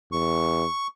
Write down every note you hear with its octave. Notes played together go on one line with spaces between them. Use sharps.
E2 C#6